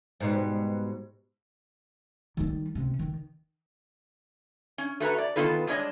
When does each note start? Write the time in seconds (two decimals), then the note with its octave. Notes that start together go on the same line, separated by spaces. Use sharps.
0.20 G#2 B2 G3
2.37 D#3 G3
2.75 C3 C#4
2.99 D#3
4.78 C#4
5.00 A3 F#4 B4 A#5
5.18 D5
5.36 D#3 G3 B3 F4 A4 B4
5.67 G3 G#3 D4 C#5 D#5